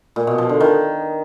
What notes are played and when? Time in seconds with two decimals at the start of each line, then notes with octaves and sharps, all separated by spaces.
0.16 A#2
0.27 B2
0.38 F3
0.49 D3
0.60 D#3